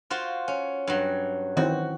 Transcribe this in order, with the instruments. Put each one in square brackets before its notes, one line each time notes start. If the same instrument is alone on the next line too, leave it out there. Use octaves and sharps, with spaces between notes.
[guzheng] F4 F#4 C5
C#4
G2 F#3
[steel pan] D#3 E3 C4 [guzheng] F#4